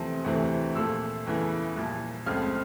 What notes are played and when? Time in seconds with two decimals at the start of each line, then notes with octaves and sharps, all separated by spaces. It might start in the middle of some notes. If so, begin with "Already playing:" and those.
Already playing: E2 C3 F3 A3 C4
0.24 D2 C3 E3 A3 C4
0.75 A#2 F3 A3 E6
1.26 E2 C#3 E3 A3
1.76 C2 A#2 F3
2.26 C#2 C#3 F3 A3 C4 F6